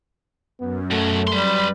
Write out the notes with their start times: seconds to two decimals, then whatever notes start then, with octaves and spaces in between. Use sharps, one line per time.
0.60 F#2 B3
0.91 B2 F#3 A3
1.27 G3 B4 C6